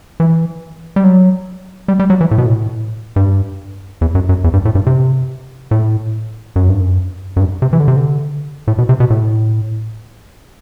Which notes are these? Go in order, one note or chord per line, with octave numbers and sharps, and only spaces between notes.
E3
G3
F#3
G3
G3
F#3
E3
A2
B2
A2
G2
E2
F#2
F#2
E2
G2
A2
G2
C3
A2
F#2
G2
F#2
F#2
G2
C3
E3
D3
C3
D3
A2
B2
C3
B2
A2